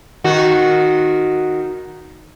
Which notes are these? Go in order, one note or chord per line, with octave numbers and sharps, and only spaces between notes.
D#3 F#4